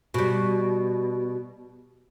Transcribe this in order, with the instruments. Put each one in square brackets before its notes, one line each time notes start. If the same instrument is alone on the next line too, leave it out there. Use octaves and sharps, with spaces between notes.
[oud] B2 G3